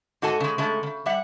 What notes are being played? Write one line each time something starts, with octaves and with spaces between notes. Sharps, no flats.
G#2 F#4 A4 G#5
C#3 G#3
C#3 G#3 A3
C#3
G3 E5 F#5